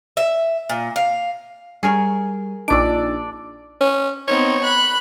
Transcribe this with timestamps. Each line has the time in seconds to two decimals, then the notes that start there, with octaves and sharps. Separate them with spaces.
0.17 E5
0.69 A#2
0.96 F5
1.83 G3 G#4 A#4 C#5
2.68 A#1 D4 D#4 D5 E6 D7
3.81 C#4
4.28 B3 C4 D#4 C#5
4.64 B5 F#6